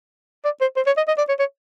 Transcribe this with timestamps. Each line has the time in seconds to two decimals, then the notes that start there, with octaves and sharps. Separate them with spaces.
0.45 D5
0.61 C5
0.76 C5
0.87 C#5
0.97 D#5
1.08 D#5
1.18 D5
1.29 C#5
1.39 C#5